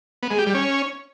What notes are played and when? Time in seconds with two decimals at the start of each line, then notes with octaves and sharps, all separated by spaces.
0.23 B3
0.31 G#3
0.38 G4
0.46 G3
0.54 C#4